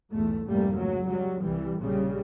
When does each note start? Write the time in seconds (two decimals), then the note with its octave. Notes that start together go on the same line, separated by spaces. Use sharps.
0.11 B1 E2 G#2 A3
0.47 F1 C2 G#2 G3 A3 A#3
0.76 C#2 F#3
1.07 F#3 G3
1.41 C2 E3 G3
1.79 A#1 C#3 G3